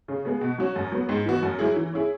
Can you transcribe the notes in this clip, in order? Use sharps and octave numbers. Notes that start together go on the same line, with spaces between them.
C#3
G#3 B3 G#4
B2
F#3 C#4 F#4
F#2
F#3 B3
G#2
E3 B3 F#4
F#2
F#3 E4 G#4
E3
C#4 E4 G#4